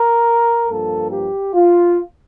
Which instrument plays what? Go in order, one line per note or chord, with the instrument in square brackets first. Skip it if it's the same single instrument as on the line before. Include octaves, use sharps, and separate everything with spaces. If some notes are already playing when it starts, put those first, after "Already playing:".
Already playing: [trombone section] A#4
G2 F3 A#3 A4
G4
F4